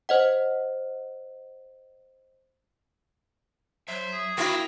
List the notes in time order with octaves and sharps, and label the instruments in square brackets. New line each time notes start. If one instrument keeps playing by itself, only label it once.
[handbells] C5 D#5 F#5
[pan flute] F#3 [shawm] C5 [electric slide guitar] E5
[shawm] G#4
[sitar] A#3 E4 [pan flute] F#4 [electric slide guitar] G5